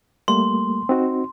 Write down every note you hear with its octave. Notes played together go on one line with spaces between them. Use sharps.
G3 A3 A#3 C6
C4 D#4 F#4